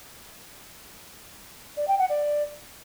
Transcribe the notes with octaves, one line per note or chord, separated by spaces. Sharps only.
D5
G5
F#5
D5